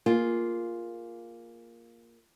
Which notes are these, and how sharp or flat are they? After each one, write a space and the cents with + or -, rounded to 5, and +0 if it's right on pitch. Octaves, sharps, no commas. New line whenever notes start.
A#3 +0 F4 +0 G#4 -5